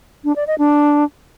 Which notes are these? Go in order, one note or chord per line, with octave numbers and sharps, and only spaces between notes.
D4
D5
D#5
D4